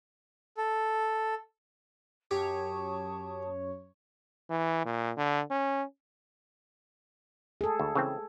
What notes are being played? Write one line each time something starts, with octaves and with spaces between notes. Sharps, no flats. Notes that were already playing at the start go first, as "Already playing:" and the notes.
A4
F#2 G4 C#5 A5 C#6 D#6
E3
A#2
D3
C#4
G#4 A4
D2
C#3 E3 C4